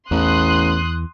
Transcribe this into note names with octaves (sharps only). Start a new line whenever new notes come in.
A1 E2 C6 D#6 F#6